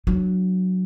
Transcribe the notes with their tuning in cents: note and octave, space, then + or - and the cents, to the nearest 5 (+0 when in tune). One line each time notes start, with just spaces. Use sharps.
F#3 +0 D4 +25